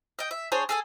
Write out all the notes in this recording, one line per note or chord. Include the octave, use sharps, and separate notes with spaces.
D#5 G5
E5
D4 G#4 C5 C#5
G#4 A4 G#5